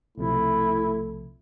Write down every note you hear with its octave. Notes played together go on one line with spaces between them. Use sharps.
B1 C3 F3 A3 E4